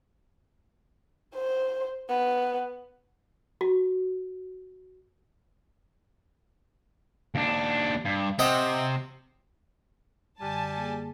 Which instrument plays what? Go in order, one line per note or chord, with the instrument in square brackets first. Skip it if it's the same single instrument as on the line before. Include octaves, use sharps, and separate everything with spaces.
[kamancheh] C5
B3
[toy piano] F#4
[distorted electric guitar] D#2 D4
G2
[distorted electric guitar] C3 [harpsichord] C4 D#5 F#5
[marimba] F#2 D3 [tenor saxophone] G3 [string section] G#5 A5
[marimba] A#3 G4 G#4